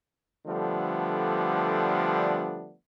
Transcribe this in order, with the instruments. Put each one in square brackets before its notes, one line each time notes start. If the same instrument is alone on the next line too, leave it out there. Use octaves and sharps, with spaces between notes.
[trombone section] D3 F3 G3 A3 B3 D4